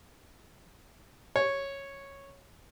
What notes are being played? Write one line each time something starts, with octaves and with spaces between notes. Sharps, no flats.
C#5